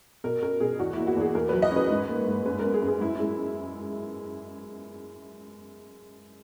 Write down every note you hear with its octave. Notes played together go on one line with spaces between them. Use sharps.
B2 A#4
C#4 A#4
B2 G#4
E2 F#4
A#3 E4
F#4
E2 G#4
E2 A#4
F#3 B4
D#5
C#4
B4
G#2
A#3
G#2
F#2 B4
B3 A#4
G#4
F#2
G#4
F#2 E4
G#3 E4